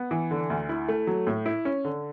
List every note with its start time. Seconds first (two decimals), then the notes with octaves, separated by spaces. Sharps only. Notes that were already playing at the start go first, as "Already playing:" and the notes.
Already playing: B3
0.11 E3
0.31 D3
0.50 D2
0.69 E4
0.88 A3
1.07 F#3
1.27 A2
1.46 E4
1.65 C#4
1.85 D3